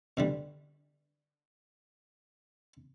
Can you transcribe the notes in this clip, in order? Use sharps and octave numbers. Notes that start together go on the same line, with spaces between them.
B2 D3 G3